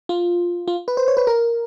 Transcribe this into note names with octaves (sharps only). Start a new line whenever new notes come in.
F4
F4
B4
C5
C#5
B4
A#4